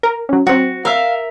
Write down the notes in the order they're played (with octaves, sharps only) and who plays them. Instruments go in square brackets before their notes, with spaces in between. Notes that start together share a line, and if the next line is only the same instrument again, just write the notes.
[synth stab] A#4
F#3 C#4
[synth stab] F#3 C4 [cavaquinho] F#4
[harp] A#4 E5 [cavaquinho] F5